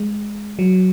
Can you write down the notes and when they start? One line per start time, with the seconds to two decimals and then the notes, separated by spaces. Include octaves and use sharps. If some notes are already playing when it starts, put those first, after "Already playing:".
Already playing: G#3
0.59 F#3